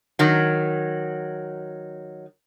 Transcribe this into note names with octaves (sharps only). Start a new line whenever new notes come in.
D#3 F#3